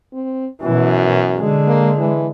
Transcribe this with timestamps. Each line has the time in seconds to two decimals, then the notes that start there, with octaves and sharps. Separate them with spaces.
0.13 C4
0.62 F#2 B2 E3
1.37 D3 G#3
1.67 A#3
1.98 E3